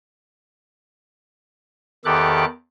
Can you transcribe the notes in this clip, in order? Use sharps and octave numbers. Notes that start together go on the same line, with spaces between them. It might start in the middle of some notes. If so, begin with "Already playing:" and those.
E2 D#3 G4 A4 D6 F#6